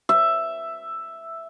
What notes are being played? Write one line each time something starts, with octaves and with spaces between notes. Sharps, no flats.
E5